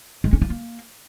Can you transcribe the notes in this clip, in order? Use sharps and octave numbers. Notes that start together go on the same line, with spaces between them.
G#3
C#4
F4
A#3